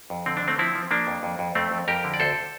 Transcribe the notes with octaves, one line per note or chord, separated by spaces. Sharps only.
F2
D3 C4
D4
D3
A3 C4
F3 C4 E4
F3
F3 A#3 D4
F2
F2
F2
F2 A3 C4
F2
F2 G4 A#4
D3
D5
D2 A4 C5